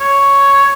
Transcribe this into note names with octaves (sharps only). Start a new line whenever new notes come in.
C#5